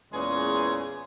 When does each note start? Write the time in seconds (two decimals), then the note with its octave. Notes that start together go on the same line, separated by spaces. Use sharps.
0.12 E2 A#2 E3 G#3 C#4 G#4